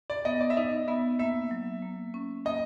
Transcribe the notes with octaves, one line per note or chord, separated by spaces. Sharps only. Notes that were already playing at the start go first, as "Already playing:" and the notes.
D5
B3 D#5
D5
E5
D#4 D#5
B3 E5
A#3 E5
F#3
A#3
C#4
A#3 D#5